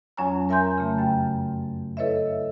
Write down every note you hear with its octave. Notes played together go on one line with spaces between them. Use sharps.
F2 F#3 C#4 C#5 G#5 A#5
A#4 E5 G#5 A#5 C6 G6
C#3 A3
F#2 G5
E4 A4 B4 C#5 D#5 E5